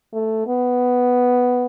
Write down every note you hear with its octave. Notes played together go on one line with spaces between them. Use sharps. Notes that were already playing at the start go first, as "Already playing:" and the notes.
A3
B3